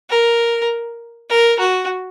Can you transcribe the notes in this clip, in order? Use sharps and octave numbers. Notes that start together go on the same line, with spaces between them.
A#4
A#4
F#4